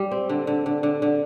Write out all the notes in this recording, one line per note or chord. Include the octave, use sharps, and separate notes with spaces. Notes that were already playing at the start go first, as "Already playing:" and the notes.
Already playing: G3 G4
C4
D3
D3
D3
D3
D3